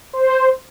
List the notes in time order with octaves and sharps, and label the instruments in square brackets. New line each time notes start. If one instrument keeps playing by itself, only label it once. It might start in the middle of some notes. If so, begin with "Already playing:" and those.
[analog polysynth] C5